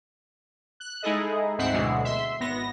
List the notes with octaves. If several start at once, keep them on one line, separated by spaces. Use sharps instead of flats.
F#6
G#3 D#4 E4 G#4 A4 D#5
D2 G#2 C4 E5 F#5 C7
D2 B2 D3 E3 F#3 G#3
E5 C6
G#1 B3 A#6